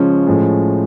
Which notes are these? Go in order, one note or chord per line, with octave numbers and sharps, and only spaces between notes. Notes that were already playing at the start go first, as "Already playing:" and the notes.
Already playing: C#3 F3 G#3 C#4
A2 F3 G#3 C#4